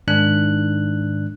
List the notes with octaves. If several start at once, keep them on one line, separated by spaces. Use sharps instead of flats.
G#2 D#3 D4 F#6